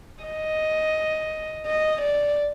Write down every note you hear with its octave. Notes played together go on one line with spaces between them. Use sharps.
D#5
D#5
D5